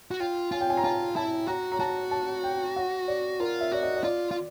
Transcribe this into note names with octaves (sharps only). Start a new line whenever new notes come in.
F#4
F4 G5
F4 G#5
G5
G#5
A#5
F4 A5
E4 A5
F#4 A#5
A#5
F#4 A5
A5
G5
F#5
D5
F4 A#4
E5
F#4 D5
D#5
D#5
F4 D5
F4